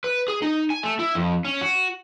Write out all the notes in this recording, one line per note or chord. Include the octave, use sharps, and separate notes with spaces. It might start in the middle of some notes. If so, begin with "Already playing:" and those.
B4
G#4
D#4
G#5
A3
E4
F2
C#4
F#4